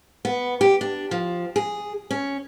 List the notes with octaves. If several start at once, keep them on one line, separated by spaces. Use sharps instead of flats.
B3
G4
D4
F3
G#4
C#4